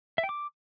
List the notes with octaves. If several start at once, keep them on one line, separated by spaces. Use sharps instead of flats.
E5
G5
D6